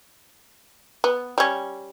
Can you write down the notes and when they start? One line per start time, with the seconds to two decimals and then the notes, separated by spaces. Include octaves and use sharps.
1.04 B3
1.38 G3 C#4